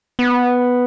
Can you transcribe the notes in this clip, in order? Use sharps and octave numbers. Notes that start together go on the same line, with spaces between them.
B3